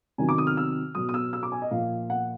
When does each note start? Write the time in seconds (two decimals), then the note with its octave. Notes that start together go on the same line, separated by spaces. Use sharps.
0.18 C3 D#3 F#3 G#5
0.29 D6
0.38 D#6
0.47 F6
0.57 E6
0.95 B2 F#3 D#6
1.09 D#6
1.14 E6
1.33 E6
1.43 D6
1.52 G#5
1.62 D#5
1.71 A#2 F3 F5
2.10 F#5